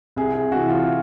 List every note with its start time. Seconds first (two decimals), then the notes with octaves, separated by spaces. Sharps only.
0.16 C2 G#4
0.34 G#4
0.52 C3 E3 F#4
0.70 F4